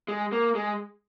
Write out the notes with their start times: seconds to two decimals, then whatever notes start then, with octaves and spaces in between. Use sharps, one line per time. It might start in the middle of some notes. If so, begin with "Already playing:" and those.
0.08 G#3
0.32 A#3
0.55 G#3